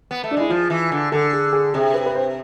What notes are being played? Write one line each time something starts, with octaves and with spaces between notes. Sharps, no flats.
B3
A3
D4
G#3 E4
F3 F4
E3
D3
D3 A4
G#4
G#4
C3 G#4
B4
B4
C5